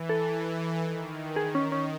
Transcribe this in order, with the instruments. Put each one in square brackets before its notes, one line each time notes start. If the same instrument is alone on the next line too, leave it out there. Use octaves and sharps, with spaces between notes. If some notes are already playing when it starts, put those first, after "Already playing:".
Already playing: [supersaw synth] E3
[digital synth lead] A4
[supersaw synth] D#3
[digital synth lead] G#4
C#4
C#4